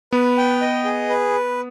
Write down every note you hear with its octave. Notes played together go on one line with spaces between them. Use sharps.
B3 B4
G5
D#5
G#4
B4